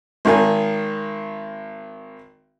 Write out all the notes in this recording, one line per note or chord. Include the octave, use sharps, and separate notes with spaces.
G#1 D#3 G#5